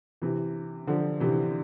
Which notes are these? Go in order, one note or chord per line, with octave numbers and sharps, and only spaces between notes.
C3 E3
D3 F3
C3 E3